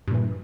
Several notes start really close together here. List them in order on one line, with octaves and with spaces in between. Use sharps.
G2 A#2 E3